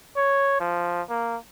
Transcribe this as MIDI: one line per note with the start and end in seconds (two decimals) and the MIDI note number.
0.16 0.60 73
0.60 1.02 53
1.10 1.37 58